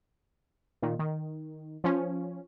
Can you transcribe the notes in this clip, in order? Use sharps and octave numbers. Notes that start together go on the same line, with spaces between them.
A#2 D#3
D#3
F3 C#4